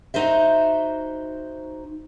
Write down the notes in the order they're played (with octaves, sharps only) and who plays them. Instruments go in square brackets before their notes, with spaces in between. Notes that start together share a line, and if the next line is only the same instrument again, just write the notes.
[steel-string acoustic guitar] D#4 F#4 C5 E5